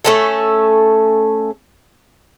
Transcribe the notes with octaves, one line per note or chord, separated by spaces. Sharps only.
A3 C#4 A4